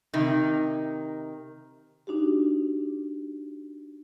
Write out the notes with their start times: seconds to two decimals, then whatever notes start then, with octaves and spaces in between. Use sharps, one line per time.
0.13 C3 D#3 D#4
2.07 D4 D#4 F#4 G4